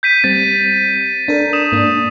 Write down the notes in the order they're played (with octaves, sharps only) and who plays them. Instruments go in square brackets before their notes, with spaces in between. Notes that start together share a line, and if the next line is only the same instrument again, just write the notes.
[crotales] G6 B6 D#7
[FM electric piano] G3 C4 [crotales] A6
[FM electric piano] D4 A4 A#4
[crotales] D#6 E7
[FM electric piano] G#2 A#3 D4